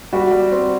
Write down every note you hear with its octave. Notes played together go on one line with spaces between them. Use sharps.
G3 F#4
G3
C4